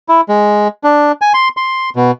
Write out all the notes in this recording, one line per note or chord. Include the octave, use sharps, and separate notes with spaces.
E4
G#3
D4
G#5
C6
C6
B2